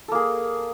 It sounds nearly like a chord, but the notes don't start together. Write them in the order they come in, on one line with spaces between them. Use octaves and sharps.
A4 A#3 G#4